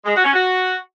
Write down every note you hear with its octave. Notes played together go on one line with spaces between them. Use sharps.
G#3
F#4
C#4
F#4